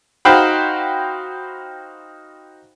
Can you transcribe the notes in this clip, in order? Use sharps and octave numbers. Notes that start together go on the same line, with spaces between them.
D#4 F#4 C5 F5 G5 B5